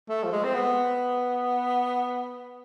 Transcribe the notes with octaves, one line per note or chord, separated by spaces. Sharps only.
A3
F3
G#3
C4
B3